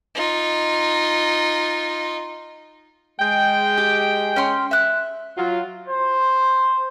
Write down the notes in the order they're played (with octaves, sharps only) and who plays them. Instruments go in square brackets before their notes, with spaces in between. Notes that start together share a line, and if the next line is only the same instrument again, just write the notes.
[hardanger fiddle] D#4 F4
[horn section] G#3 G5
[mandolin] G4
C#4 C6
E5 F#6
[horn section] F#3 F4
[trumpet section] C5